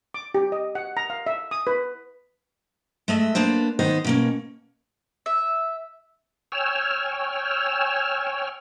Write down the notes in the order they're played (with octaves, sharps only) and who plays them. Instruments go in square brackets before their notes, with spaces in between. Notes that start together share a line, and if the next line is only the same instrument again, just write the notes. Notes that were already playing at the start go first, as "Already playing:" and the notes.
[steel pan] D6
G4
D#5
F#5
A#5
F5
E5
D#6
B4
[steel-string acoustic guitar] G#3 A3 D#5 E5
A#3 B3 D4 C5
D#2 D#3 B3 D#4 C5 D#5
B2 A#3 C#4
[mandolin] E5
[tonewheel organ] C#5 G5 G#5 E6 F6